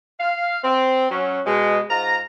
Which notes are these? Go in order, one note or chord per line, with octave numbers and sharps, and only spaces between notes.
F5
C4
F#3 C#4
B2 G#3
G#2 F4 A#5